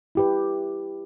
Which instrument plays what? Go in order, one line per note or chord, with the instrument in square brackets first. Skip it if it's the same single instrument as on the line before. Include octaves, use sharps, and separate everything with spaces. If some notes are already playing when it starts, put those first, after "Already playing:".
[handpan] E4 G4 B4